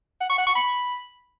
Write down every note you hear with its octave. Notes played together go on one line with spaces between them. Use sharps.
F#5
C#6
F#5
C#6
B5